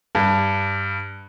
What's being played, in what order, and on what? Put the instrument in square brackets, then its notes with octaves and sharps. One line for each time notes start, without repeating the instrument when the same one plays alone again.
[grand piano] G2